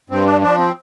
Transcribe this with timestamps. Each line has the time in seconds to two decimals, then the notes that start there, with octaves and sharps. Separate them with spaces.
0.10 G2 C4
0.26 D4
0.41 F3 D4
0.58 C4